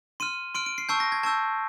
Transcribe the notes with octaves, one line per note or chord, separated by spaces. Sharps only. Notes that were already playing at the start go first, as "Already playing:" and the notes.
C6 F6 D#7
C6 F6 D7
D7
C7
A5 C#6 E6 G6 C7
A#6
G#6
A5 C#6 E6 G6 G#6